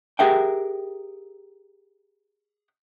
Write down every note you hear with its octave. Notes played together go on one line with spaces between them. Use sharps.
G4 G#4 A#4 E5 F#5 G5